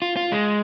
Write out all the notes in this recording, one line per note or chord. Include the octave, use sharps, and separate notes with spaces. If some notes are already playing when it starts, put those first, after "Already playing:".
F4
F4
G#3